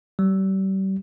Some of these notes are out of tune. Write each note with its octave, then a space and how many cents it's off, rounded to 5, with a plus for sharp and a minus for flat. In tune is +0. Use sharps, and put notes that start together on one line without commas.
G3 -35